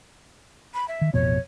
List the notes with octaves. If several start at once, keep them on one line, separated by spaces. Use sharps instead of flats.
B5
E5
D#3
A1 F2 B2 C#5